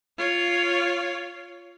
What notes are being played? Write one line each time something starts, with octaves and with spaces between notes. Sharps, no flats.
F4 C#5